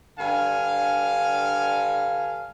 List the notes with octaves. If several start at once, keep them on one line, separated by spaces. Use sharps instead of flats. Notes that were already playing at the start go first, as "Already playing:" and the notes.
G2 D3 F5 G#5